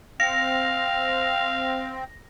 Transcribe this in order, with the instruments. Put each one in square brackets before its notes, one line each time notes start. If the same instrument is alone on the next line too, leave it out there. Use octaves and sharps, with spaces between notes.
[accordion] C4 [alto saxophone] F5 [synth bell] A#6